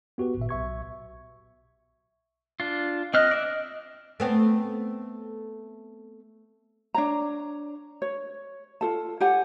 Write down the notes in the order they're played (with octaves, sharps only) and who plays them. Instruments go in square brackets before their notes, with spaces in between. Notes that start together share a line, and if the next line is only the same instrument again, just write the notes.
[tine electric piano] B3 F#4 G4 B4
G#1 A#2 E5
B1 E5 C#6 G#6
[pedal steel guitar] D4 F4
[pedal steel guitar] C4 F6 F#6 [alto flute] D#5
[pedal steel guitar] D5 E5
[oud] A3 B3 C4
[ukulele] D4 C#5 A#5
C#5
F4 A4 A5
G4 C#5 F#5 G#5